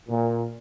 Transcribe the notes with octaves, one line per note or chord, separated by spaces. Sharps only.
A#2